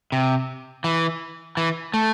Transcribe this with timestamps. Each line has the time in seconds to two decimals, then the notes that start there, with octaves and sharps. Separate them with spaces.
0.12 C3
0.84 E3
1.57 E3
1.94 A3